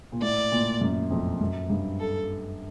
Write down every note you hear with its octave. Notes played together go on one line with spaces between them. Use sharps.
A#2
A2 D5
A#2
F#2
F2
F#2
G2
A4